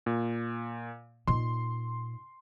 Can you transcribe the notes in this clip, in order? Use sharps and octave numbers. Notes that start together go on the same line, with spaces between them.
A#2
A#2 D#4 C6